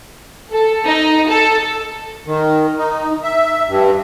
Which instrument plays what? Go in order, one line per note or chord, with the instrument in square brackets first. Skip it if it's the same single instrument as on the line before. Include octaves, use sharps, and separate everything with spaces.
[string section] A4
D#4
A4
[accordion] D#3
D#4
E5
G2